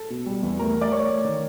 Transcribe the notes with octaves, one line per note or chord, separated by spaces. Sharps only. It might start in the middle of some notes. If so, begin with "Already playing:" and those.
Already playing: A4 A5
B2
G3
E2
A3 A#4 A#5
A3
D5 D6
A3 C#5 C#6
A3
D#3